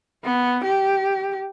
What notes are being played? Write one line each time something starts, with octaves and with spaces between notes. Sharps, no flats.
B3
G4